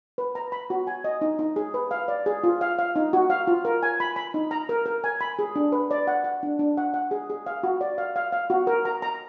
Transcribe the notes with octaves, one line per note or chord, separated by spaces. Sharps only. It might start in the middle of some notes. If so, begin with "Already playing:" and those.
B4
A#5
B5
F#4
G#5
D#5
D#4
D#4
G#4
B4
F5
D5
G#4
F4
F5
F5
D#4
F#4
F5
F4
A#4
G#5
B5
B5
D#4
A#5
A#4
A#4
G#5
B5
G#4
D4
B4
D5
F#5
F#5
D4
D4
F#5
F#5
G#4
G#4
F5
F#4
D5
F5
F5
F5
F#4
A#4
A#5
A#5